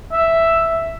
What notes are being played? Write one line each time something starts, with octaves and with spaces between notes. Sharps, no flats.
E5